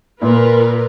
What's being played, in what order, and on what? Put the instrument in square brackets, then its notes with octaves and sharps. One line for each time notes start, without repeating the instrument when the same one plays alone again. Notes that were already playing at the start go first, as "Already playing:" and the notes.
[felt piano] A#2 [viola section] F4 A#4 B4